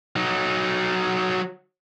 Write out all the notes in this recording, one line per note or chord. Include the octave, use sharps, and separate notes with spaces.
F#3 D#4